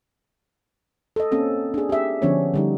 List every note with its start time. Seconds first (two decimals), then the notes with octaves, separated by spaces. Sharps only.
1.16 A4 D#5
1.32 A#3 C4 C#4 A4
1.74 D4 G#4
1.89 G4 E5
2.22 D3 F3 B3 C#4 D4 C#5
2.54 D3 G3 D#4